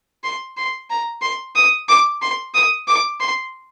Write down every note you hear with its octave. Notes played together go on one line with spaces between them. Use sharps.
C6
C6
A#5
C6
D#6
D6
C6
D#6
D6
C6